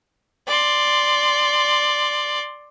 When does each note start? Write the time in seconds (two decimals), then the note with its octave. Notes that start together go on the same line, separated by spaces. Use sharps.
0.47 D5 C6